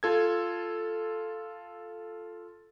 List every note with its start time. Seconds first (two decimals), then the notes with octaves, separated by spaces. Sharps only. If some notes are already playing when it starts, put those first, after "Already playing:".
0.03 F4 A4 G#6